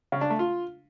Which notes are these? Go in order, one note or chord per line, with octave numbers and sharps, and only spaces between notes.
C#3
D4
A3
F4